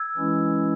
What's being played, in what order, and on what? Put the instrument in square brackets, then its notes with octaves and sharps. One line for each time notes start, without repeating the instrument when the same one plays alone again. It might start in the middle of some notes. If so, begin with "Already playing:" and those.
Already playing: [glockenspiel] E6 G#6
[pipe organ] E3 G#3 C#4 E4